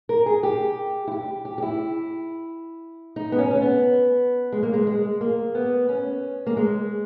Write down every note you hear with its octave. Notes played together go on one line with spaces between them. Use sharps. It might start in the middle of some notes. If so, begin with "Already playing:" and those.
A#4
G#4
G4
E4
G4
G4
G4
E4
D#4
B3
C#4
C#4
B3
G#3
A#3
G#3
G#3
A#3
B3
C#4
A#3
G#3